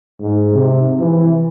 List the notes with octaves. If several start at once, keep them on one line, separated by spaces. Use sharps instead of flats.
G#2
C3
E3